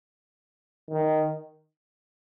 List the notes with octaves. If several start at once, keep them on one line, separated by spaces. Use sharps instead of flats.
D#3